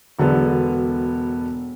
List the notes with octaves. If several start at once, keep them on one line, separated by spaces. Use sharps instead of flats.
E1 D3 F#3 B3 A4